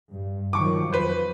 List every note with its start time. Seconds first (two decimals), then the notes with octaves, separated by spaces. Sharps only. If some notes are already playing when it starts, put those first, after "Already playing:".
0.11 G2
0.53 D#3 F3 F#3 C#6 D6
0.93 F2 B4 C5